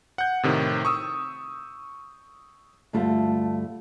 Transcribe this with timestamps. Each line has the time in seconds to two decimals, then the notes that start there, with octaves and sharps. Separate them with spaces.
0.18 F#5 G6
0.43 A2 C3 D#3
0.85 C#6 D#6 E6
2.93 D2 G2 A3 F4